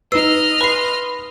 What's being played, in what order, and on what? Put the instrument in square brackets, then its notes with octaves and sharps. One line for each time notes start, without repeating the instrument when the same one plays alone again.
[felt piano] D#4 B4 [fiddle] D#5 F6 [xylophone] E6 C7
[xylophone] B4 C7 [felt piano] B5 C6